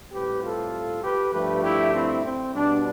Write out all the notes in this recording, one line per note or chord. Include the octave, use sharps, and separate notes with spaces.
A2 G3 C4 G4 B4
F4 A4
G4 B4
G2 F3 A3 G4 B4
E4 G4
C4 E4
C4
B2 G3 B3 D4